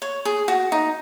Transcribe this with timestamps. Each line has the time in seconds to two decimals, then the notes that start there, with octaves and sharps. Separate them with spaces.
0.02 C#5
0.25 G#4
0.48 F#4
0.72 D#4